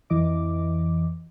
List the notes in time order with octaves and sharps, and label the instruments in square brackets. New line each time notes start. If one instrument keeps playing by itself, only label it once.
[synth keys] F2 E3 D#5 D6